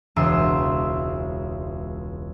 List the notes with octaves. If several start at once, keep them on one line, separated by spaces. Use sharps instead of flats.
E1 C#2 E5 C6 E6